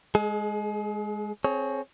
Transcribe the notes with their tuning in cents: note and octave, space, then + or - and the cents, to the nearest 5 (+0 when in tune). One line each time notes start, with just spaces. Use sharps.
G#3 +0 G#4 +40
C4 +15 G#4 +35 C#5 +0